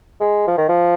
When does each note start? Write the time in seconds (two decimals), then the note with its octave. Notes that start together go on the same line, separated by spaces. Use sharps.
0.20 G#3
0.47 F3
0.58 D#3
0.69 F3